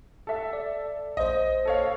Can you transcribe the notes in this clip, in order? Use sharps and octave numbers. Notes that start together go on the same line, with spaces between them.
A4 E5
D5
A#1 C5 D#5
A4 C#5 F5